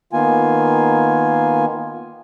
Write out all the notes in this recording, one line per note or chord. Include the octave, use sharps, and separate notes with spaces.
D#3 A#3 B3 F4 G#5